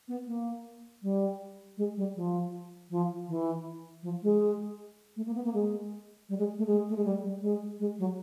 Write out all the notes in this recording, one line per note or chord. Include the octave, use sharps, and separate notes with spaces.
B3
A#3
G3
G#3
G3
F3
F3
E3
F3
G#3
A3
A#3
B3
A#3
G#3
G3
G#3
A3
G#3
A3
G#3
G3
G3
G#3
G#3
F#3